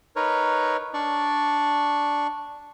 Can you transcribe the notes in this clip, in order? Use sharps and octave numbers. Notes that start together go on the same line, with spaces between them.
D#4 A#4 B4 C#5
D4 D5 C#6